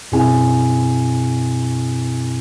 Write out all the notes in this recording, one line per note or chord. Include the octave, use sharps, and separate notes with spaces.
F#2 B2 C4 E4 G#4 G#5